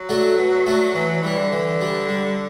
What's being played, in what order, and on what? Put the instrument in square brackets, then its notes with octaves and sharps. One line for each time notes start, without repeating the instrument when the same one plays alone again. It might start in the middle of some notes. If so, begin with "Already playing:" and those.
Already playing: [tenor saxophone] F#3
[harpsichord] A3 D4 F#4 A4
B2
A3 D4 F#4 A4
[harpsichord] E3 [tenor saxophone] F#3
[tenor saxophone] F#3
[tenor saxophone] E3 [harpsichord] G3 D4
[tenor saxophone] D3
[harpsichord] E3
G3 D4
G3